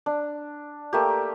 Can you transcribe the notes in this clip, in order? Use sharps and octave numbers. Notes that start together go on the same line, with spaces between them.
D4
A3 A#3 G4